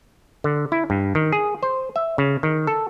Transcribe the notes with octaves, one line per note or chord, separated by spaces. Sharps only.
D3
E4
G2
D#3
G#4
C5
E5
C#3
D#3
A4